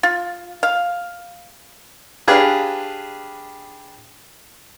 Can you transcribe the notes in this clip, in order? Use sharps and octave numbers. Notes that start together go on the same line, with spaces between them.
F4
F5
D4 G4 G#4 B4 F5